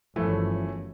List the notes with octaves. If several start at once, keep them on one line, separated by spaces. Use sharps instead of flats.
G1 F#2 E3 F3 A3 C#4